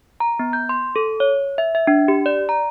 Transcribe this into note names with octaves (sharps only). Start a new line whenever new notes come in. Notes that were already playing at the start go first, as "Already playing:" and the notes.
A#5
B3
G6
C6
A4
C#5
E5
E5
D4
G4
D5
A#5